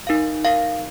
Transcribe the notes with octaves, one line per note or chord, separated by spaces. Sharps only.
D#4 A#4 F5
D#4 A#4 F5